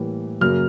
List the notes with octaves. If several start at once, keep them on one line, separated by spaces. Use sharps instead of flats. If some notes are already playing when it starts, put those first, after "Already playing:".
Already playing: A2 E3 G3 A#3
F#2 C#3 F#3 A#3 F6